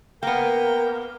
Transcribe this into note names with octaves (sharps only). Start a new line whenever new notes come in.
A#3 B3 A#4 G5